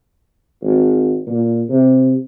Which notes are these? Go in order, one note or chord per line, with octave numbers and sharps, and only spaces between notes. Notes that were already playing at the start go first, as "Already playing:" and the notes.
G#1
A#2
C3